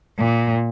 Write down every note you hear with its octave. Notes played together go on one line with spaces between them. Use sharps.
A#2